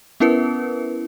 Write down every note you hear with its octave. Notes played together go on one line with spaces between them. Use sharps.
B3 C#4 E4 A#4 B4